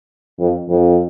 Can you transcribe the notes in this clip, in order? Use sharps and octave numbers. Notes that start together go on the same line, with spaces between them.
F2
F2